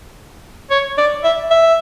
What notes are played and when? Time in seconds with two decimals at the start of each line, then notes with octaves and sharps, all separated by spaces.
0.71 C#5
0.98 D5
1.24 E5
1.51 E5